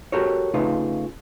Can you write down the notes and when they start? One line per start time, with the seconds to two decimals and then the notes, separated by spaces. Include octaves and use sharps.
0.12 F#4 G4 A4 A#4 C#5
0.54 C#3 A3 D#4 F4 B4